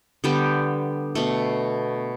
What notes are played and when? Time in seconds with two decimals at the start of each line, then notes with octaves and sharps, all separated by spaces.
0.24 D3 G3 B3 G4
1.15 B2 A3